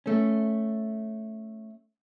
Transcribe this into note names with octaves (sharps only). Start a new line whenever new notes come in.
A3 C#4